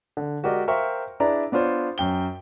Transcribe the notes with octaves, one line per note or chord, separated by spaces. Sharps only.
D3
G#3 F#4 G4 A#4 D5 D#5
A#4 C5 E5 F5 G5 C#6
D4 E4 G#4 B4 D5 A#5
B3 D4 F4 C5 C#5
F#2 G5 G7